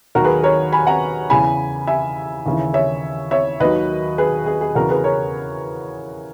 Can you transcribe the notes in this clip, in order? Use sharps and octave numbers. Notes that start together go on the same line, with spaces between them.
D#2 D#3 F#3 F#4 A#4
G#4 B4
A#4 C#5
G#5 B5
F#5 A#5
E2 C#3 E3 G#5 B5
E5 G#5
D#2 C#3 E3
C#5 E5
C#5 E5
D#2 D#3 F#3 B4 D#5
G#4 B4
G#4
G#4
E2 C#3 E3 F#4 A#4
G#4 B4
A#4 C#5